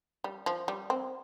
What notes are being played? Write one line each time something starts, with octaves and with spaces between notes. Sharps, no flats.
G3
F3
G3
C4